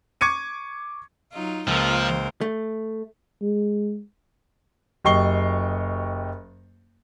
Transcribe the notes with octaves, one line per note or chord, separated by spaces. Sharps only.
C#6 D6 G#6 C#7 D#7
F#3 D#4 F4
C#2 F3 A#3 A#4 C5 E6
A3
G#3
F#1 G4 D#5 C#6 C7 G7